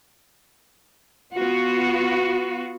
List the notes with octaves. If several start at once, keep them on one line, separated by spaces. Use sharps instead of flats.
B3 F4 F#4